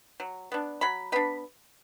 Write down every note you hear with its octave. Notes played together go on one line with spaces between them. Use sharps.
F#3
B3 D4
F#3 B5
B3 D4 B5